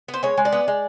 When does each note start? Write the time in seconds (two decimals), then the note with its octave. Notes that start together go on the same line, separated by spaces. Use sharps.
0.08 B3
0.14 C5
0.23 G#3 C#5
0.38 G#3
0.45 D5
0.52 B3
0.68 G#3